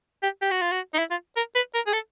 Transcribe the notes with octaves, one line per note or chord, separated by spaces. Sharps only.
G4
G4
F#4
F4
F#4
D#4
E4
F4
A#4
B4
A#4
G#4
A4